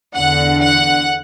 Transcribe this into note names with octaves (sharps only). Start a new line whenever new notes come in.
E2 D3 F#5
F#5